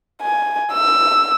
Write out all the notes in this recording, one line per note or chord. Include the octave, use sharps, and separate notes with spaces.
G#5
E6